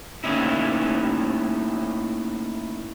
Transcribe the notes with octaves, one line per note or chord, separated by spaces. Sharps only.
A3 A#3 C#4 D#4 E4